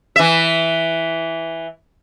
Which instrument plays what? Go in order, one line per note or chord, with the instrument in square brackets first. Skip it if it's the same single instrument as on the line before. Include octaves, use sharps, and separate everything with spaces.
[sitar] E3 E5